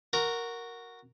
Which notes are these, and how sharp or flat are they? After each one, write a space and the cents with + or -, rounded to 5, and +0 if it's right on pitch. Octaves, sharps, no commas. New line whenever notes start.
F#4 -5 A#4 +0